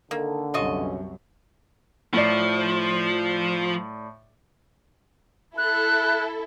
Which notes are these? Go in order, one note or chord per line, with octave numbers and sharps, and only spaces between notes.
D3 D#3 A#3 A4
C2 F#2 B2 C#4 F4 F#4 D#5
A2 F3 D5
E4 A4 F#6